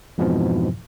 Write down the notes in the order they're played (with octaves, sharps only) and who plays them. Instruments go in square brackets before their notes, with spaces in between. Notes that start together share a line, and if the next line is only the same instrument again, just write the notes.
[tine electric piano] F2 G#2 B2 E3 F3 E4